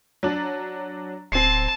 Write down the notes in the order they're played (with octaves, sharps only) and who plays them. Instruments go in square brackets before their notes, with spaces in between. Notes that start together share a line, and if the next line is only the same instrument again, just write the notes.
[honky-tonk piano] F#3 D4
[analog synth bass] D1 [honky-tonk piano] C4 C7 [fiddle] A5